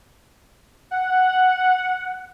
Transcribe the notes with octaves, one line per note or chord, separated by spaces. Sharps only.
F#5